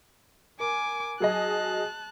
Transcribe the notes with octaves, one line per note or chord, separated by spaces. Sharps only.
A#4 G#5 D6
F#3 G#4 D#5 A5 F#6